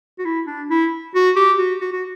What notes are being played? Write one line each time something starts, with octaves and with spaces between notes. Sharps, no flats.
F#4
E4
D4
E4
F#4
G4
F#4
F#4
F#4